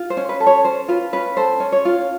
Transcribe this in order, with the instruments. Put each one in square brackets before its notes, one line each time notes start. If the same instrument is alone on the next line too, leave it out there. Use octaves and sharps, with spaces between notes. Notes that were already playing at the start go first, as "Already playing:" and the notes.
Already playing: [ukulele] F4
C5
C#4
B4
A4
C#5
C#4 C5
F4 B4
C#4 B4
A4 C5
C#4
C#5
F4